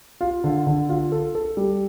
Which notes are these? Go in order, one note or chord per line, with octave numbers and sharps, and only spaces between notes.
F4
D3
D3
F4
A4
A4
G3